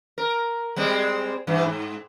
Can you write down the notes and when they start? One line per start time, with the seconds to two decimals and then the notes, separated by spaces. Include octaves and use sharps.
0.18 A#4
0.76 G3 G#3 C4
1.47 G2 E3
1.66 G#2